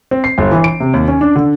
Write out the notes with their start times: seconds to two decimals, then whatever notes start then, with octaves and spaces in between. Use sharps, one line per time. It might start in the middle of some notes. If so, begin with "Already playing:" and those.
0.11 C4
0.24 C7
0.38 G1
0.52 E3
0.64 D7
0.80 C3
0.94 D#2
1.08 C#4
1.21 D4
1.36 D3